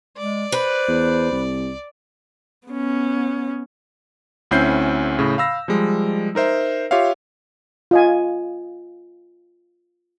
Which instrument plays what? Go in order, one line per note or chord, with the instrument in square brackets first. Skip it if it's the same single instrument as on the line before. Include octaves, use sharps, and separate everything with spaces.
[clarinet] G#3 [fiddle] D5
[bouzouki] B4 [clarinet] C5
[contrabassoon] E2
C2
[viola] B3 C#4
[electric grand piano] D2 C4 C#4 E4 G6 C7
A2 C#3
F5 B5 E6 A#6
F3 G3 G#3
D#4 A#4 C5 E5
F4 G4 C#5 E5 F5
[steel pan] F4 D#5 G#5